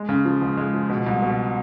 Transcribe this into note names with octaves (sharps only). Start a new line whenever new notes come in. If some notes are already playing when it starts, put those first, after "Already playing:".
Already playing: G#3
C#3
F3
C#2
G#3
F3
B2
C2
B2